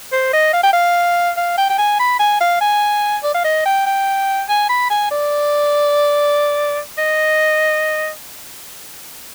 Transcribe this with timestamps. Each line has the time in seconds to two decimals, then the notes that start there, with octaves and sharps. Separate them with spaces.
0.12 C5
0.33 D#5
0.53 F5
0.63 G5
0.73 F5
1.37 F5
1.58 G5
1.69 G5
1.78 G#5
1.99 B5
2.19 G#5
2.40 F5
2.61 G#5
3.23 D5
3.34 F5
3.44 D#5
3.65 G5
3.86 G5
4.49 G#5
4.69 B5
4.90 G#5
5.11 D5
6.98 D#5